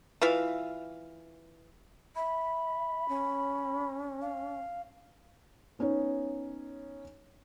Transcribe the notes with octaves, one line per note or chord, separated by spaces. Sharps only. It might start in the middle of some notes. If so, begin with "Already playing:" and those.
E3 F4 E5 F5
E5 B5
C#4
F5
B3 C#4 D#4 C#5